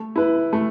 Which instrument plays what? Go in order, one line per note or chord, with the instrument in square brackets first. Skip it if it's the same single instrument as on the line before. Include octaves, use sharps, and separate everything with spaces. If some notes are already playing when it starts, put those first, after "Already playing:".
Already playing: [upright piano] A3
E4 B4
A3